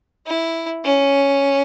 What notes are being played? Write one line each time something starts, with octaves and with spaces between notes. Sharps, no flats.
E4
C#4